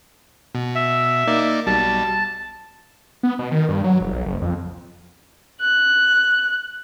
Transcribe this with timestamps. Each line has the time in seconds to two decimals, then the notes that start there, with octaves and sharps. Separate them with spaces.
0.55 B2
0.75 E5
1.27 A#3 D#4 D5
1.67 B1 B2 G3 A5
3.23 B3
3.39 B2
3.51 D#3
3.69 G2
3.84 F#3
4.01 F1
4.12 B1
4.26 F#1
4.42 F2
5.61 F#6